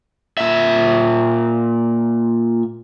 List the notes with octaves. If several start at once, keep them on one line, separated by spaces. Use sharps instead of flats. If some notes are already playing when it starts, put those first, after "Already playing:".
A#2 E5